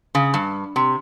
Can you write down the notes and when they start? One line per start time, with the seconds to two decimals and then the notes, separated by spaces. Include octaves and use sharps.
0.15 C#3
0.34 G2
0.76 C3